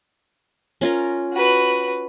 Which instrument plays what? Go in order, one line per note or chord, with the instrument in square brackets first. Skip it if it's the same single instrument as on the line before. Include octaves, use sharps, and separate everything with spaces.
[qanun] C#4 F4 A#4
[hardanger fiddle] F#4 B4